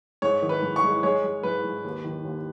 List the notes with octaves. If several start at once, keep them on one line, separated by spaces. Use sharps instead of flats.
G#2 C#5
D#3
B4
G#2
C#6
G#3
G#3 C#5
G#3
G#2 B4
G#2
D#2
D#3
D#2